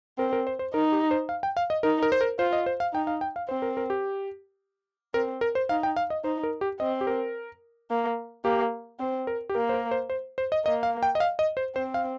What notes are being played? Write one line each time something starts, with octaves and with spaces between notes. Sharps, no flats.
C4 A#4
A#4
C5
C5
D#4 A#4
G4
C5
F5
G5
F5
D#5
D#4 A#4
A#4
C5
A#4
F4 C5
D#5
C5
F5
D#4 G5
F5
G5
F5
C4 C5
A#4
A#4
G4
C4 A#4
A#4
C5
D#4 F5
G5
F5
D#5
D#4 C5
A#4
G4
C4 D#5
G4
A#4
A#3
A#3 G4
C4 C5
A#4
G4
A#3 A#4
C5
A#4
C5
C5
C5
D#5
A#3 D#5
F5
G5
D#5
F5
D#5
C5
C4 C5
F5